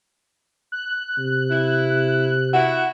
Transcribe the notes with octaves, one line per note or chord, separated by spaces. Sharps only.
F#6
C3
E4
E4 F#4 F#5